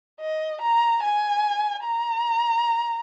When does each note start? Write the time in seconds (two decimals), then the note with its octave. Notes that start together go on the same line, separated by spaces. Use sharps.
0.20 D#5
0.61 A#5
1.02 G#5
1.83 A#5